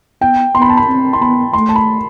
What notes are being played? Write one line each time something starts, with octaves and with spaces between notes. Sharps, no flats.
B3 G5
B3 C6
B5
A5
B5
C4
C6
B3 B5
A3 C6
A5
B5